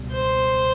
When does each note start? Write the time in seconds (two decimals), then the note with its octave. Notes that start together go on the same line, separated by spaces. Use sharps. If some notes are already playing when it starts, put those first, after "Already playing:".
Already playing: C#2 B2 G3
0.12 C5